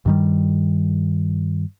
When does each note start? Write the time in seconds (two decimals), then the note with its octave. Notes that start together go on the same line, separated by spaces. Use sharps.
0.06 G2 D#3 G3